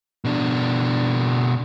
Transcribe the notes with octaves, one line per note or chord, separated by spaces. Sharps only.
B2 D4